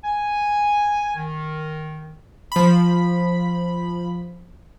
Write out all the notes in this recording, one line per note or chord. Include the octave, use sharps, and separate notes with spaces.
G#5
D#3
F3 B5